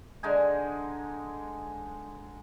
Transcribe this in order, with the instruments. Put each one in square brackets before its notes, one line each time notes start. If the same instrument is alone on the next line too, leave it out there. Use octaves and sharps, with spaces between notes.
[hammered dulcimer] D3 G#3 D#4 G#5